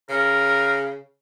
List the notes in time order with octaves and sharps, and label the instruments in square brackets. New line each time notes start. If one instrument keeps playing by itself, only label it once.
[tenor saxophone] C#3 [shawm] A#4